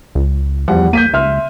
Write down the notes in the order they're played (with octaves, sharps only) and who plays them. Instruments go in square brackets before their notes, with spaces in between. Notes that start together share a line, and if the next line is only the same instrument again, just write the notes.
[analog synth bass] C#2
[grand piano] E2 G3 F#5 [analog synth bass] F3
[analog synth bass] A#3 [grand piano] G6 B6 D#7
[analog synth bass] C#2 [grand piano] E5 C6 F6